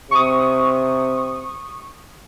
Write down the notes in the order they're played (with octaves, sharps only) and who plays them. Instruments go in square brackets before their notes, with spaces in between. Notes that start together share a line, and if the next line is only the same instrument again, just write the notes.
[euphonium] C3 [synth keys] C#6 D#6